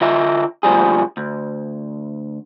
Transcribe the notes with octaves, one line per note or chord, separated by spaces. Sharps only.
D3 F4 D#5 E5
D2 A#2 F3 G3 G#4
D2